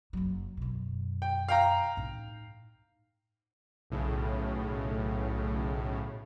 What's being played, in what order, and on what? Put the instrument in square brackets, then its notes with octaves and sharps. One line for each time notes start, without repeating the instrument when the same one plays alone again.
[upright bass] F#1 F#3
F#2 B2
[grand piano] G5
F5 G5 A#5
[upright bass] A2 D#4
[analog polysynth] B1 A2 C#3